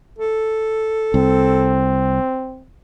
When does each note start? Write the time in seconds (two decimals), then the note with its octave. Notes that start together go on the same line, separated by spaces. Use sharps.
0.18 A4
1.14 C2 C4